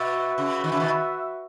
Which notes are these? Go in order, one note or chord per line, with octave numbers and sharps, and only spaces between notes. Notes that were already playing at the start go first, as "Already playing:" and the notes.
Already playing: B2 F#4 B4 E5
C#3
D#3
C#3
B2 D#3